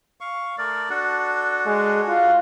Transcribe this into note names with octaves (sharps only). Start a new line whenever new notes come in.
F5 C#6
A3 A#4 D5
D4 F#4 A4
G#3
F4